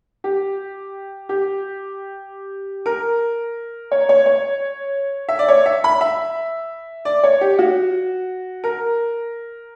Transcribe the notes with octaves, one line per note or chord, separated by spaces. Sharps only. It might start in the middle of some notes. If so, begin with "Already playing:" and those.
G4
G4
A#4
C#5
C#5
C#5
E5
D5
C#5
E5
B5
E5
D5
C#5
G4
F#4
A#4